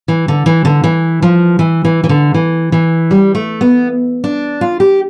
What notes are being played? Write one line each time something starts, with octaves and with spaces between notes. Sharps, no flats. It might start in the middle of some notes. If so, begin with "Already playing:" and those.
E3
D3
E3
D3
E3
F3
E3
E3
E3
D3
E3
E3
G3
A3
B3
D4
F4
G4